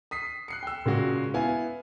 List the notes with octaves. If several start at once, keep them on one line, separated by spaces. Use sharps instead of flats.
D#6 B6 C7
F#6 C7 C#7
G5 E6
A#2 C#3 G#3 F#4
B3 E4 F5 G#5